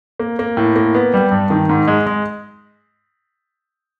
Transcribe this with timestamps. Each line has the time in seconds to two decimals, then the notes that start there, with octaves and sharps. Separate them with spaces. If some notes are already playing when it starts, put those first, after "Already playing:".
0.19 A#3
0.39 A#3
0.57 A2
0.76 A#3
0.95 B3
1.14 G3
1.31 G2
1.50 D#3
1.69 G#2
1.88 G#3
2.06 G#3